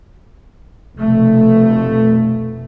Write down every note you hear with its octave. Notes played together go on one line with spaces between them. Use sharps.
F1 B2 A3